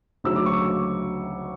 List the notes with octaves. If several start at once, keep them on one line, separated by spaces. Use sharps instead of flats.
D2 C#3 F#3 E6
D6
C#6
D6